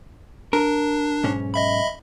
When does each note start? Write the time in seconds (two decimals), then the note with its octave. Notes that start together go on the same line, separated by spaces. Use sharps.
0.53 D4 A#4
1.24 B1 G#2 C#4
1.54 D#5 E5 B5